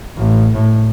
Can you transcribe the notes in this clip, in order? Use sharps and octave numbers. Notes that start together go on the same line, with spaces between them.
A1
A2